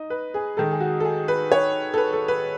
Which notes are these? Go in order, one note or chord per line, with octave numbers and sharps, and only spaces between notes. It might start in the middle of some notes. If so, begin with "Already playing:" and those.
Already playing: D#4 D#5
B4
G#4
D#3 G#3 D#4 A4
G#4
F#4
A4
G#4
B4
C#5
A4
B4
A4
B4